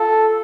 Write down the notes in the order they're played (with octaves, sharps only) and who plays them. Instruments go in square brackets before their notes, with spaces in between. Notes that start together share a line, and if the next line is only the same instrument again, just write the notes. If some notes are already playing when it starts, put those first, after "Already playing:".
Already playing: [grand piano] F4 [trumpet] A4